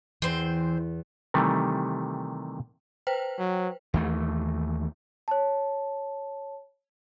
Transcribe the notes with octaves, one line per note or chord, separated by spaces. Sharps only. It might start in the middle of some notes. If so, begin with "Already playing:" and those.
E2 E3 C4 C5
C3 D#3 E3 G3 A3
B4 C5 G5
F#3
D#2 E3 A3
C#5 A5